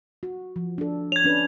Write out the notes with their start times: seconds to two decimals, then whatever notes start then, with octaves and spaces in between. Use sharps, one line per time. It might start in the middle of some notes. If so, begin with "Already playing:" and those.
0.23 F#4
0.56 F3
0.78 D4 A4
1.12 C#5 G#6 F7
1.24 C#4 D4 B4